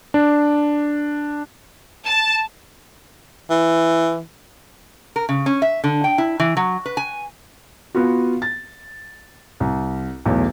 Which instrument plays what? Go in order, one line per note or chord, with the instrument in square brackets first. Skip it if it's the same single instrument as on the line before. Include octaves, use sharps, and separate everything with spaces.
[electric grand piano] D4
[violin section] A5
[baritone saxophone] E3
[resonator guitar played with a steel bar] A#4
C#3
C#4
E5
D3
G5
E4
E3
F#3
B4
G#5
[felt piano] B3 F4 F#4
A6
C2
B1 E2 A2